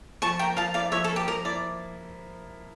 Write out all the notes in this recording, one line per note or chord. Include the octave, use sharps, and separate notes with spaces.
F3 A5 C#6
A#3 G5 A#5
F3 F5 A5
E4 D5 F5
F3 C#5 E5
A4
A#3
G4
F3 A#4
E4 D5